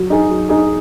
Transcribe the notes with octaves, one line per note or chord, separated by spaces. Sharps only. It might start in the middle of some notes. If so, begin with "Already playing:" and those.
Already playing: F#3
D#4 G#4
F#3
D#4 G#4